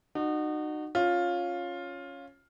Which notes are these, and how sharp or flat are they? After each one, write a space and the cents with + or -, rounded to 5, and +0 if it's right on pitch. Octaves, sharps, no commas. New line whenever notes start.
D#4 -35 F#4 +0
C#4 +0 F4 +10